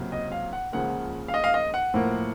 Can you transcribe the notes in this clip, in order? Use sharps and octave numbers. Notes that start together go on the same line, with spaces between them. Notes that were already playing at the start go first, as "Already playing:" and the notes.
Already playing: C#2 C3 F#3 A#3
D#5
F5
F#5
C#2 C#3 F3 A#3 F#5
F5
D#5
F5
D#5
F#5
A2 F3 A#3